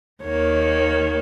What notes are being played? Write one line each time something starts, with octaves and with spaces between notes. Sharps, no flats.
D#2 D#3 A#3 C#5